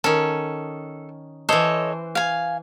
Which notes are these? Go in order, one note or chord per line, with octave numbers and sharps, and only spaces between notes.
D#3 C#4 A4
E3 A4 C5 C#5 D#5
F5 G#5